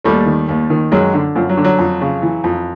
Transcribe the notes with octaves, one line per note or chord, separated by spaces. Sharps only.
D#2 G3 A3
D#3
D#2
D#3
F#2 F#3 G#3
D3
F#2 F3
F#3
D3
F#3
F2
C#3
E3
F2